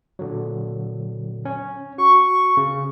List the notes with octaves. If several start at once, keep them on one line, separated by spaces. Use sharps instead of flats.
A#2 D3 F#3
C#4
F#4 C#6
C#3